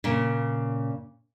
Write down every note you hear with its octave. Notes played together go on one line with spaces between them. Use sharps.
A#2 C#3